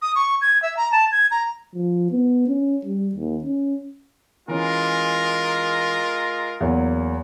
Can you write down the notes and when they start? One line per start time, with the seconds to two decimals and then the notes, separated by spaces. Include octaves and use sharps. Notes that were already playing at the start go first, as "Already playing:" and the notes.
0.02 D#6
0.15 C#6
0.41 G#6
0.62 E5
0.77 A#5
0.92 A5
1.12 G#6
1.31 A#5
1.74 F3
2.11 B3
2.48 C#4
2.85 G3
3.15 D#2
3.44 C#4
4.48 E3 G#3 C#4 F4 A#4
6.60 E2 F#3 A#3